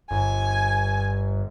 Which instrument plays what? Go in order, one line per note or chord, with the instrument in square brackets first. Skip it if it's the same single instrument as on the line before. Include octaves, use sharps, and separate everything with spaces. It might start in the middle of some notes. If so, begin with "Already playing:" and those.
[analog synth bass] G1 [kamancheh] G#5